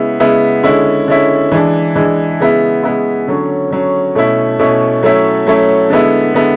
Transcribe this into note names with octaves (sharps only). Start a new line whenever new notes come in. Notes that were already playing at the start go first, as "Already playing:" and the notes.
Already playing: C#3 G#3 B3 E4
C#3 G#3 B3 E4
D3 G#3 C#4 E4
D3 G#3 C#4 E4
E3 G#3 D4
E3 G#3 D4
C#3 G#3 B3 E4
C#3 G#3 B3 E4
D3 F#3 C#4
D3 F#3 C#4
B2 A3 C#4 E4
B2 A3 C#4 E4
F#3 A3 C#4 E4
F#3 A3 C#4 E4
D3 G#3 B3 E4
D3 G#3 B3 E4